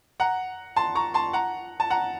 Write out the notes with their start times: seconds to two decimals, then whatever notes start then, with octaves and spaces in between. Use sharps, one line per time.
0.20 F#5 A#5
0.76 A5 C6
0.95 A#5 C#6
1.14 A5 C6
1.33 F#5 A#5
1.80 A5
1.90 F#5 A#5